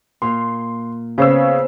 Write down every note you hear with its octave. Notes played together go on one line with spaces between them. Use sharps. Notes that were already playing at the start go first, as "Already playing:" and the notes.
A#2 F5 C6
C#3 B3 C4 C5 C#5 E6